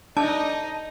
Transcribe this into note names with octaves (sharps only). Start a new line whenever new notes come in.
D4 D#4 D#5 A5